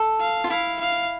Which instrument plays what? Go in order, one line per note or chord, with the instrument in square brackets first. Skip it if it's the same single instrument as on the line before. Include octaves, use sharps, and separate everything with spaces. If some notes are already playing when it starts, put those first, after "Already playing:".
Already playing: [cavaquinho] A4
[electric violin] F5
[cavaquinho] F4
[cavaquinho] E4 [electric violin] F5
[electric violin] F5